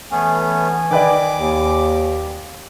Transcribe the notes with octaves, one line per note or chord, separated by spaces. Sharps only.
E3 A3 B3 C#4 G#5
D#3 B4 D5 D6
D#2